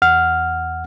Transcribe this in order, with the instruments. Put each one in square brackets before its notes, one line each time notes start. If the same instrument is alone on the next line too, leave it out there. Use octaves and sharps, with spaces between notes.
[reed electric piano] E2 F#5 F6